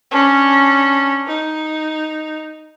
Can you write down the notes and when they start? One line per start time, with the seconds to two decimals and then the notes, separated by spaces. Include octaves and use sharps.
0.11 C#4 D4
1.27 D#4